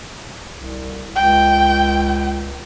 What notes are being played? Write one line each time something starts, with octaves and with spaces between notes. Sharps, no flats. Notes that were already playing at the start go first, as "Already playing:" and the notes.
C2
C#2 G5